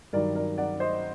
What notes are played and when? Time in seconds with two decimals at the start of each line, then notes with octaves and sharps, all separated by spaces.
0.13 G2 D#3 F#3 A#4 D5
0.35 A#4 D5
0.58 D5 F#5
0.80 C5 D#5